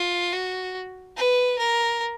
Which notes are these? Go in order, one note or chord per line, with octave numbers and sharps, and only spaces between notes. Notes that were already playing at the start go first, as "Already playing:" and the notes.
Already playing: F4
F#4
B4
A#4